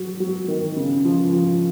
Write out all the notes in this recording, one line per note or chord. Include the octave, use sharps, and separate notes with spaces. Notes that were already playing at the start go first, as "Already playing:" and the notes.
Already playing: F#3
F#3
D#3
C#3
F3
F3